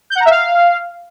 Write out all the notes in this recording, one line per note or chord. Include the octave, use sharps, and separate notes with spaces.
G6
F#5
A#5
E5
F5